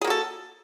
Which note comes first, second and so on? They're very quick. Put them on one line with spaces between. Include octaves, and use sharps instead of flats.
G#4 A#3 F#4 A4